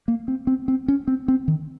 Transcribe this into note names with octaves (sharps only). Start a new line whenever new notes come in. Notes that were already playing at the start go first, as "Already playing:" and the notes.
A#3
C4
C4
C4
C#4
C4
C4
D#3